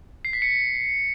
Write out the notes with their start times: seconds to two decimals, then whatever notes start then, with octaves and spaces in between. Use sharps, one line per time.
0.25 C7
0.33 B6
0.42 C#7